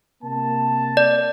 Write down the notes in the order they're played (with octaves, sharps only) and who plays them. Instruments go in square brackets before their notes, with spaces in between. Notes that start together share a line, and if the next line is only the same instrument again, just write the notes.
[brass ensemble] C3 A#3 A5
[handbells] D5